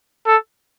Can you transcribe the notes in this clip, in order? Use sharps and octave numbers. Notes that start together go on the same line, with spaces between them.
A4